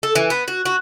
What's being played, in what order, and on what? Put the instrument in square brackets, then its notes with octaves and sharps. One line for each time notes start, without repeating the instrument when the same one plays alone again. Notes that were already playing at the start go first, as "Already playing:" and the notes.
[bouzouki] A4
E3
B3
F#4
F#4